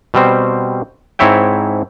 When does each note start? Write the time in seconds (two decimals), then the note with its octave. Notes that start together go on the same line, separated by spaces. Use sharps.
0.14 B2 G3 C4 C5
1.19 G#2 C4 E4 C#5 E5 G5